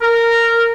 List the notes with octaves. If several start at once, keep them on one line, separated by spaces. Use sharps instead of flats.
A#4